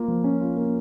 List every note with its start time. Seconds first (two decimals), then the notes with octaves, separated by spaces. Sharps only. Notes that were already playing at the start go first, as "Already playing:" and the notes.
Already playing: A#3 F4
0.08 F3
0.24 C#4
0.41 F4
0.57 A#3